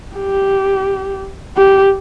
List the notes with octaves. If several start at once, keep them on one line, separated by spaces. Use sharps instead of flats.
G4
G4